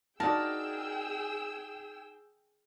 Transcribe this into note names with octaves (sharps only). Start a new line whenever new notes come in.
D#4 F#4 G#4 A#4 D5 G5 A5 E6